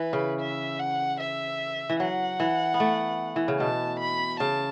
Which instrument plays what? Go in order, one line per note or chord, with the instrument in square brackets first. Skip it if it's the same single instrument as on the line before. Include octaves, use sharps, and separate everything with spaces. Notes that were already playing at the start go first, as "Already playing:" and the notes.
Already playing: [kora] E3 [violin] B4
[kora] C#3
[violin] E5
F#5
E5
[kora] E3
[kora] F#3 [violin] F#5
[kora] E3
B3
A3
E3
C#3
[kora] B2 [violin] A5
[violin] B5
[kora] C#3 [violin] A5